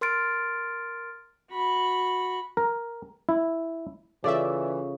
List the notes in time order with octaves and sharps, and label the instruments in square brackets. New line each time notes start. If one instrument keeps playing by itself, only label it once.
[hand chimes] A#4 C6 F6 A6 D7
[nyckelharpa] F#4 B5
[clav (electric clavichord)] A#4
E4
[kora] C#3 [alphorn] E3 [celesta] F4 A4 C#6 [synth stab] D5 E5